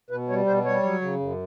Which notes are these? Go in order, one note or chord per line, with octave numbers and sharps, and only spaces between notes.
B2 B4
G3 C#5
B2 C5
G3 C#5
F#3
C#3
F#2